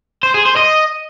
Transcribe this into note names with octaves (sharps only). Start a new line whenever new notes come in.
C5
G#4
C5
D#5